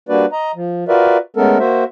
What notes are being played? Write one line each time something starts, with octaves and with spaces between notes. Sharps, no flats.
G3 A#3 D4 F#4 B4 D5
D#5 A#5
F3
F4 F#4 A#4 B4 D5 E5
G#3 A3 B3 C#4 A4 A#4
A#3 F#4 C5 E5